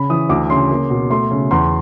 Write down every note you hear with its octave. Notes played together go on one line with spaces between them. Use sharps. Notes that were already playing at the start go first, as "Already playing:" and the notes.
Already playing: C#3 B5
E3 D#6
D2 D6
C#3 C6
A#3
B2
A3 C6
C#3
E2 C6